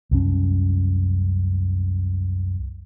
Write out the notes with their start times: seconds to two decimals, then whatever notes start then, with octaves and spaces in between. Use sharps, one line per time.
0.11 C2 F#2 C#4